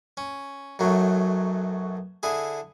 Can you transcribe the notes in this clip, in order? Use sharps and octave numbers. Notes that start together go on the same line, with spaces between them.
C#4
B1 F#2 F#3 A3
D3 E4 G#4